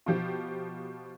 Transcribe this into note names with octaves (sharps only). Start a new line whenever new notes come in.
B2 F3 G4